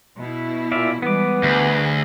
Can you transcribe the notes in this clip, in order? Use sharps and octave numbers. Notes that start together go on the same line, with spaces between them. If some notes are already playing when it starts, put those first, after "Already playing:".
B2 E4
A#2 D5 E5 F5
E3 G3 G#3 B3 B4 D6
D2 G#4